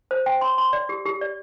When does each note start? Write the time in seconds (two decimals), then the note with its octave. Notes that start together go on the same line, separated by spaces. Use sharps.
0.11 C5
0.26 G5
0.41 C6
0.58 C6
0.73 D5
0.89 G4
1.05 G4
1.21 D5